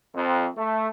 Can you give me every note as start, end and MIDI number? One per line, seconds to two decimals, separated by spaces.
0.15 0.46 41
0.56 0.88 57